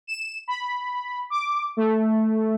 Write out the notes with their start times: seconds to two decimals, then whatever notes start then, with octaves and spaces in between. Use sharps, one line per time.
0.07 E7
0.48 B5
1.30 D6
1.77 A3